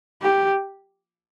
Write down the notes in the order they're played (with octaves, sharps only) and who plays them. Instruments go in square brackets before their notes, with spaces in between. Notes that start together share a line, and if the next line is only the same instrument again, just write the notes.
[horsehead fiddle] G4